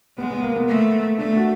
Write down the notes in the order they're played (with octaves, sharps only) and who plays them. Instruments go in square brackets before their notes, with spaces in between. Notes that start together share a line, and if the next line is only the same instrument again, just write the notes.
[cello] G#3 [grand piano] B3
[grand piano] B3
A#3
B3
[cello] A3
[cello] A3 [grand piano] D4
[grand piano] F#4